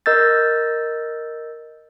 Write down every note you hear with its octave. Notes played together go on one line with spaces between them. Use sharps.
A#4 D#5 E6 G6 A6